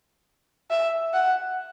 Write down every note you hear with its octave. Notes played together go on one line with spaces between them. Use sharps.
E5
F#5